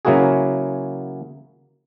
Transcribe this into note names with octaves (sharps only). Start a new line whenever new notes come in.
C#3 F#3 A#3 E4 F#4 G#4